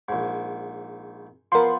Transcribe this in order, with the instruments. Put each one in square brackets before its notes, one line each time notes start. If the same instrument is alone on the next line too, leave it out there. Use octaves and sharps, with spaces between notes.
[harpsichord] A#1 G#2
[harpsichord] F3 B3 [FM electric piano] A#4 C6